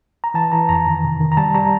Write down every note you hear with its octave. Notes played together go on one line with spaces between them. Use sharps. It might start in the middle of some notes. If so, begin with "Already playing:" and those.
A#5
E3 A5
E3 A#5
F2 A#5
D#3
C3
D#3
A#5
G3 A5
G3 A#5